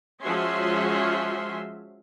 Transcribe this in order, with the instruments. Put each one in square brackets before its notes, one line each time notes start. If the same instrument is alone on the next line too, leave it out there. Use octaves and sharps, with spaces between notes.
[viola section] F3 G#3 C#4 F#4 E5 C6